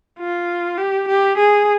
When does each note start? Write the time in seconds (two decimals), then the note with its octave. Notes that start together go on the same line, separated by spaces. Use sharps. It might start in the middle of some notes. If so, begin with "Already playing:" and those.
0.19 F4
0.78 G4
1.08 G4
1.37 G#4